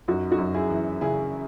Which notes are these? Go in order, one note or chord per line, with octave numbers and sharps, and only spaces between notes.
F#2 D#4 F#4
D#4 F#4
F#2
E4 G#4
E3
C#3 E4 G#4